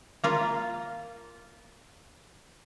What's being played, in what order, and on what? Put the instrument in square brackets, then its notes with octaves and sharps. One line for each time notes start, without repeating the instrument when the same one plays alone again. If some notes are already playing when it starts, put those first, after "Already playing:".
[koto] A#3 F4 F5